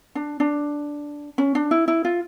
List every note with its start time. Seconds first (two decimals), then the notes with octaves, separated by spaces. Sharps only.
0.15 D4
0.40 D4
1.38 C#4
1.55 D4
1.71 E4
1.88 E4
2.05 F4